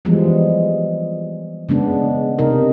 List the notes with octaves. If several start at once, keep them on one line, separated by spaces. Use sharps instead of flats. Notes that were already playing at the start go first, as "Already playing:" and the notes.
E3 F3 G3 G#3 B3
C#3 G#3 B3 D4
C3 D#4 A#4